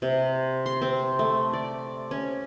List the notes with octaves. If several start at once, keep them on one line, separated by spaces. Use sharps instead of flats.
C3
C6
C4
A3
D5
C#4